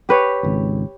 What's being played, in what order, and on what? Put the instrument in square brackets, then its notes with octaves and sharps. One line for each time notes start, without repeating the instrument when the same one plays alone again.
[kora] G4 B4 C#5
[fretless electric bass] G#1 C#2